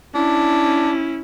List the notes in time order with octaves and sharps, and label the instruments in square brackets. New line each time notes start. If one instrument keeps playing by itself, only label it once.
[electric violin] C#4 E4 [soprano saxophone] D4